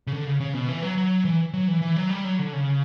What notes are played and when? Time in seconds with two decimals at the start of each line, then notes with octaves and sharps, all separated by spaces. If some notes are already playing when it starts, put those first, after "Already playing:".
0.07 C#3
0.12 D3
0.26 C#3
0.41 C#3
0.55 B2
0.69 E3
0.83 F#3
0.97 F#3
1.25 E3
1.54 F#3
1.68 E3
1.82 E3
1.96 F#3
2.10 G3
2.24 F#3
2.39 D3
2.53 C#3